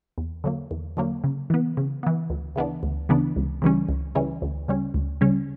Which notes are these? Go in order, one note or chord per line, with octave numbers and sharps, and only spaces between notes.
E2
D3 F#3 A#3
E2
D3 F#3 A#3
C#3
E3 B3
C#3
E3 B3
D2
C#3 E3 B3 D4
D2
C#3 E3 B3 D4
C#2
C#3 E3 G3 C#4
C#2
C#3 E3 G3 C#4
D2
C#3 G3 C#4
D2
C#3 G3 C#4